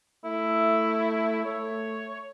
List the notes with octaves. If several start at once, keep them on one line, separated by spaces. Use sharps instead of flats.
A3 E4
A3 C#5